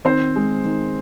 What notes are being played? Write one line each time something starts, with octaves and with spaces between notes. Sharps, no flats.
D#3 C4 C5
G#3
D#3